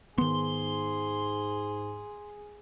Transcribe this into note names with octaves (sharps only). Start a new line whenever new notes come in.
G#2 D#3 B3 G#4 C6